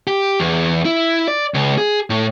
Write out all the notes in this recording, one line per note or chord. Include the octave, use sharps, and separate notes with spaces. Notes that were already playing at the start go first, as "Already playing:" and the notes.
G4
E2
E4
D5
C#2
G#4
A2